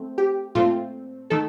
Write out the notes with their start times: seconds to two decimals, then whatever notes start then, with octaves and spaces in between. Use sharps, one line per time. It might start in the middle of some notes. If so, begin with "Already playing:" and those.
Already playing: A3 C4
0.18 G4
0.55 A#2 A3 C4 F4
1.30 D#3 A3 A4